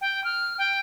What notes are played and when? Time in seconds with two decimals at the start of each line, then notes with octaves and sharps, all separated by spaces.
0.01 G5
0.24 F6
0.58 G5